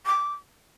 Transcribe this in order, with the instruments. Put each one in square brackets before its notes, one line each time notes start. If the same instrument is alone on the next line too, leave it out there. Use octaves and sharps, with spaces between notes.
[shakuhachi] D6